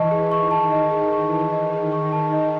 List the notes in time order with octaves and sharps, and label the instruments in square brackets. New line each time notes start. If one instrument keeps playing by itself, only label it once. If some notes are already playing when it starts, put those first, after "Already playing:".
Already playing: [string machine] E3 [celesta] D#5 A5 C#6
[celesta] G#4
[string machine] D#3 [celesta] C#6
[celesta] A5
D#5
G#4
[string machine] E3 [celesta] C#6
[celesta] A5
[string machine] D#3 [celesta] D#5
[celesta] G#4
C#6
A5
D#5